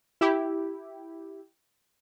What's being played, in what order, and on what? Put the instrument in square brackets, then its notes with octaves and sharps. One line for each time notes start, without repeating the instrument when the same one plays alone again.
[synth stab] E4 G4